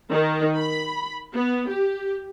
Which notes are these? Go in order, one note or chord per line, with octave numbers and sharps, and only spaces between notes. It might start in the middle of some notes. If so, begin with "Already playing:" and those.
D#3
B5
B3
G4